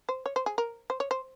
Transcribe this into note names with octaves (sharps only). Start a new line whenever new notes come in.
C5
C#5
C5
G#4
A#4
C5
C#5
C5